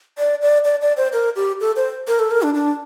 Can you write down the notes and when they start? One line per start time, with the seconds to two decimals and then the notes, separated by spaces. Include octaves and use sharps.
0.18 D5
0.42 D5
0.65 D5
0.82 D5
0.97 C5
1.13 A#4
1.36 G4
1.61 A4
1.76 C5
2.07 A#4
2.19 A4
2.31 A#4
2.42 D4
2.54 D4